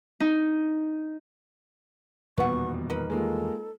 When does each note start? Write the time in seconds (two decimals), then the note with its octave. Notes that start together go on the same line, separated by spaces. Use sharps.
0.20 D#4
2.38 D#1 E2 B2 D#3 G3 B4 F#5 C#6
2.90 D#4 A#4 B4
3.10 G#3 A#3 F4 A4